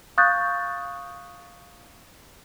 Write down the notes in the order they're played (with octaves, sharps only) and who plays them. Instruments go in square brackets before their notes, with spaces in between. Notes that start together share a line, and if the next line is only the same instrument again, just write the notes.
[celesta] F5 C#6 D#6 F#6 G6 A6